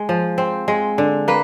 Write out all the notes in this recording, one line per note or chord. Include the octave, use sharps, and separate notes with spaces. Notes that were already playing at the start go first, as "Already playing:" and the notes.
Already playing: G#3
F3
C4
G#3
D3
A#3 B4